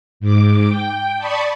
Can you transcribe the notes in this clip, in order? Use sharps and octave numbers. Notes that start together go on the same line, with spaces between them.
G#2 D6
G5
D5 A5 B5 C#6 D#6